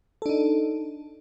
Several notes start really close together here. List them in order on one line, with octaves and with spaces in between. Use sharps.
A4 D4 D#4